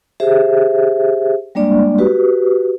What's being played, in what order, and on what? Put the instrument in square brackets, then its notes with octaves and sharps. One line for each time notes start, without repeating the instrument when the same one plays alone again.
[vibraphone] G4 G#4 C5 E5
G3 G#3 A#3 D4 D5
F#4 G4 B4